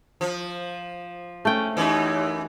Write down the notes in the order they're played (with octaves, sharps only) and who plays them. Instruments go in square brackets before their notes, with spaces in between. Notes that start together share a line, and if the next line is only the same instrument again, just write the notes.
[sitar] F3
[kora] A3 G5 [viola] C#4
[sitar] F#2 E3 [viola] D#4 G4